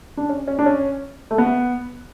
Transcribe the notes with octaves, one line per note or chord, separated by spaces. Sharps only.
D4
C#4
C#4
D4
C#4
A3
B3